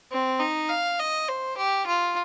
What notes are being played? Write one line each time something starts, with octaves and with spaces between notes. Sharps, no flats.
C4
D#4
F5
D#5
C5
G4
F4